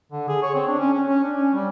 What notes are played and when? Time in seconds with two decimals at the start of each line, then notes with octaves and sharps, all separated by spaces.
0.12 D3
0.28 G#4
0.43 C#5
0.55 C4
0.67 D4
0.79 C#4
0.93 C#4
1.06 C#4
1.23 D4
1.36 C#4
1.54 G3